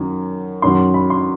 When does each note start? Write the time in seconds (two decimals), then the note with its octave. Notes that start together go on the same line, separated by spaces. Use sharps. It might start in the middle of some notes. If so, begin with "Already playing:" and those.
Already playing: F#2 D#3 F#3
0.62 F#2 D#3 F#3 C6
0.94 B5
1.10 C6